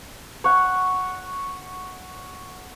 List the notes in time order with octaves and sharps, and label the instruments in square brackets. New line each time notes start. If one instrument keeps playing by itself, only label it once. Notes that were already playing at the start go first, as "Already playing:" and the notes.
[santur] C#5 F#5